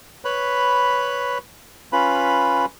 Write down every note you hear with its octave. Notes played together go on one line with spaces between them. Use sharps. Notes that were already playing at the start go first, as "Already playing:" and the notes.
B4 C#5 B5
C#4 F4 B4 B5